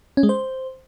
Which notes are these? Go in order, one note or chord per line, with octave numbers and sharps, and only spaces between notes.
C#4
G#3
C5